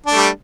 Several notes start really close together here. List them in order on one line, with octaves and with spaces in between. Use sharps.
D4 A3 G3